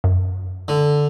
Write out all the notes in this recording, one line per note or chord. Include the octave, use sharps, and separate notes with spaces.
F#2
D3